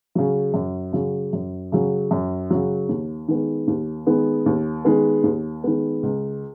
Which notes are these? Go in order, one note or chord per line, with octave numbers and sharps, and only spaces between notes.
C#3 F#3
F#2
C#3 F#3
F#2
C#3 F#3
F#2
C#3 F#3
D#2
D#3 G#3 B3
D#2
D#3 G#3 B3
D#2
D#3 G#3 B3
D#2
D#3 G#3 B3
C#2